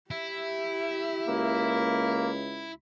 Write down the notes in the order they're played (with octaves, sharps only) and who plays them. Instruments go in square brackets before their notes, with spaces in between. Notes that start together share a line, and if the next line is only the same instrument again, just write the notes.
[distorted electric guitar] E4 [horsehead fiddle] G4 E5
[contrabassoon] C#2 [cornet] A#3